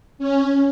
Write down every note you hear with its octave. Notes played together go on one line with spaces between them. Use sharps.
C#4